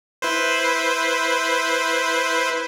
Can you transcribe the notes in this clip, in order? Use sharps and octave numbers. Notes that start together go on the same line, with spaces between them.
E4 B4 C5